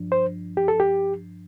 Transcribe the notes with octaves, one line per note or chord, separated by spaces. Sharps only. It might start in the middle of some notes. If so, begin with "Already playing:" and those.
Already playing: G2 F3 D4
C5
G4
A4
G4